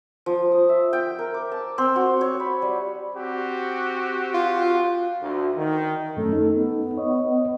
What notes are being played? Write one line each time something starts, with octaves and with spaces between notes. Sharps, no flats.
F3
D#6
E5
G5
A#4
D6
A5
C4
F#4
C#5
B5
G3
C4 F#4 G4
F4
D2
D#3
F#2 A3 C#4 A4
D#4
B3
C#5 D#5